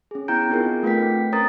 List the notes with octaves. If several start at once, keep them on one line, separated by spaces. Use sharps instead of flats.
C#4 G#4
B3 E4 G5 A#5 G6 D7
B3 C4 D#4 F4 G#4 A#4
A3 F4 B4 G5 B6
A3 C4
C#4 A#4 C5 A#5 D#6 A6